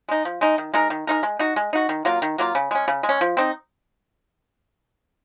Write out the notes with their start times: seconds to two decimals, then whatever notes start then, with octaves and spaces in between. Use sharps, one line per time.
0.09 G#3 D#4
0.25 F3
0.41 G#3 D#4
0.58 D#3
0.74 G#3 D#4 A#4
0.90 D#3
1.07 G#3 D#4 A#4
1.23 G#3
1.39 D#4 F#4
1.56 G#3
1.73 D#4 F#4
1.89 D#3
2.05 F#3 A#3 F4
2.22 D#3
2.38 F#3 A#3 F4
2.55 C#3
2.71 G#3 C#4
2.88 C#3
3.03 G#3
3.09 C#4
3.21 F3
3.37 C4 D#4